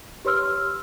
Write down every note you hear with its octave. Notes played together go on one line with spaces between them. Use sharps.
G4 B4 C#5 C6 E6 F6